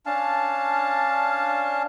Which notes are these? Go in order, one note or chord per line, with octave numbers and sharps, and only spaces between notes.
C#4 D4 F5 A5